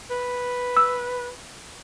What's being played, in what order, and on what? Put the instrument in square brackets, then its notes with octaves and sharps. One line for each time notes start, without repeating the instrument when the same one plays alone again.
[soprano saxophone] B4
[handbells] E6